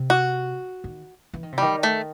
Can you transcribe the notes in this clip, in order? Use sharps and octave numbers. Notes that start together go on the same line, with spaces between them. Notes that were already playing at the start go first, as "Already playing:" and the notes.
Already playing: C3
F#4
D#3
E3
D#3
C3
D#3 G3
A3